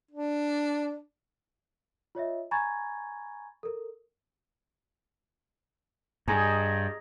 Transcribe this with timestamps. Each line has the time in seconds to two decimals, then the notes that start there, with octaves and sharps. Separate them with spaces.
0.11 D4
2.15 F4 C#5 D#5 E5
2.51 G#5 A#5 B5 C#6 G#6 A6
3.63 A4 A#4
6.28 G2 G#4 D#5 A#5